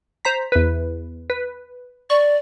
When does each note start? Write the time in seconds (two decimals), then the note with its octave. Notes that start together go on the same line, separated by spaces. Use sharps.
0.25 C5 A#5 B6
0.52 E2 B4
1.30 B4
2.10 D5 C#6